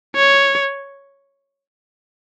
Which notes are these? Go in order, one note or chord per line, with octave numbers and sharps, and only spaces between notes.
C#5